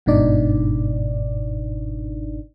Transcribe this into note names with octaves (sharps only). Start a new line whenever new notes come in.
G1 G#2 B2 D4 D#4 D5